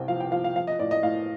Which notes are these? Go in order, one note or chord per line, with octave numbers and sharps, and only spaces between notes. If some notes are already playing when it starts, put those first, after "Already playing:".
Already playing: C2 C3 G5
F3 F5
G5
F3 F5
F5
F3 F5
D#5
A2 D5
D#5
A2 F5